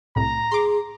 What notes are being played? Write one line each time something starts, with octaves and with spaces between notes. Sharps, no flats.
C2 A2 A#5
G#4 C6 D6